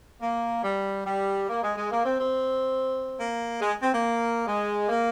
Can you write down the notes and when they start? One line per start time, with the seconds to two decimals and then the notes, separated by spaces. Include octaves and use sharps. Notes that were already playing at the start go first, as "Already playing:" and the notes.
0.21 A#3
0.64 G3
1.06 G3
1.49 A#3
1.63 G#3
1.77 G#3
1.91 A#3
2.05 C4
2.20 C4
3.19 A#3
3.61 G#3
3.83 C4
3.93 A#3
4.47 G#3
4.89 A#3